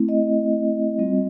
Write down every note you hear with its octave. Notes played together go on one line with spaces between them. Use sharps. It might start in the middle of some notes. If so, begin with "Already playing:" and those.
Already playing: A3 C4 E4
D#5
G3 C4 F4